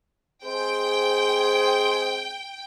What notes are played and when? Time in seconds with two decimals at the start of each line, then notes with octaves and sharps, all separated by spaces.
0.45 G#3 C4 G#4 C5 G5